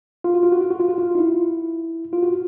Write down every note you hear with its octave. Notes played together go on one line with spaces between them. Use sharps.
F4
F#4
F4
F#4
F4
F#4
F4
F#4
F4
D#4
E4
F4
F#4